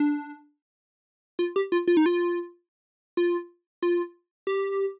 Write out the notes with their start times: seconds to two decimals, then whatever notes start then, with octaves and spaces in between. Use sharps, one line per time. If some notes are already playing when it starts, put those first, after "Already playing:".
Already playing: D4
1.39 F4
1.56 G4
1.72 F4
1.88 F4
1.97 D#4
2.06 F4
3.17 F4
3.82 F4
4.47 G4